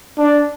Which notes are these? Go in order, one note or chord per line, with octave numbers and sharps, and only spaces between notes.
D4